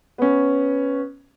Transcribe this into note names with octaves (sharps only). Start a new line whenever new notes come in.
B3 C#4